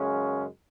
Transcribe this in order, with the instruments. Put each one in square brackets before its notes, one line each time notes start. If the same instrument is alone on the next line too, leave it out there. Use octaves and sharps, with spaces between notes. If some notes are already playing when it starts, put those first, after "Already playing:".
Already playing: [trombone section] F#2 C#3 G#3 C#4